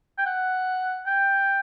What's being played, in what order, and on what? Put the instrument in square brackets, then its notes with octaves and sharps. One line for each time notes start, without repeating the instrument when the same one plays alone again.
[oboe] G5
F#5
G5